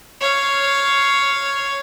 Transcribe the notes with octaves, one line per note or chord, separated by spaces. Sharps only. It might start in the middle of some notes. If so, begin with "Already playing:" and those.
C#5 F5